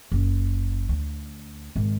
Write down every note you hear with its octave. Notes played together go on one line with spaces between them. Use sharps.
F#1
D2
G#1